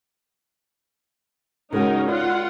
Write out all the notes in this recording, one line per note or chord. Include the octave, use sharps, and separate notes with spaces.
C#3 G#3 C#4 D#4 F#4 A#4
F4 D5 F#5